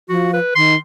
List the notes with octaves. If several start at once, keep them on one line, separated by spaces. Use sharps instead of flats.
F3 F#4
B4
D#3 C6